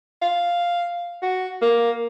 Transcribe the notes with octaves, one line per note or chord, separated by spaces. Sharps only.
F5
F#4
A#3